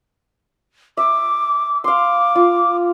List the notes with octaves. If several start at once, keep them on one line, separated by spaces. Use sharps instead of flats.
E5 D6
F5 C6 D6
F4